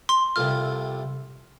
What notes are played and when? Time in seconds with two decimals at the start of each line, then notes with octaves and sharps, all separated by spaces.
0.09 C6
0.36 C2 C3 A3 F4 F6